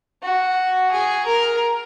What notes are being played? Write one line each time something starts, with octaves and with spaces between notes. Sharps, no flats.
F#4
G#4
A#4